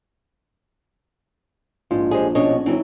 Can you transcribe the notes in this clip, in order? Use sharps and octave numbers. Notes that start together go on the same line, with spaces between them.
A#1 G#2 F4
F#2 G#3 G4 G#4 C5
B2 C#4 D4 C#5 D#5
G#1 E3 F#3